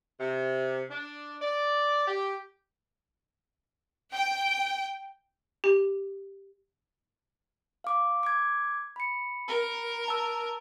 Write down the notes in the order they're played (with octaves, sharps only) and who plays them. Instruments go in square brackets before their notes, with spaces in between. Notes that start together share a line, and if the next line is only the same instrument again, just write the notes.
[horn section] C3
D4
D5
G4
[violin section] G5
[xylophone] G4
[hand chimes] F5 D6
D6 G#6
B5 C#7
[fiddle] A#4
[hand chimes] A5 E6